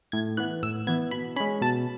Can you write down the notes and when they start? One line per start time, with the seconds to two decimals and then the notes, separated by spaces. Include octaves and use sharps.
0.12 A2 G#6
0.37 E3 B3 F#6
0.63 A2 E6
0.87 E3 B3 G#6
1.11 B2 B5
1.36 C#4 B5
1.40 G#3
1.61 B2 A5